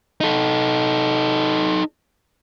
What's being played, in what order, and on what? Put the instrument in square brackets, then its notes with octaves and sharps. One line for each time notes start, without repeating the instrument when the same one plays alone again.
[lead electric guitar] D#4 A4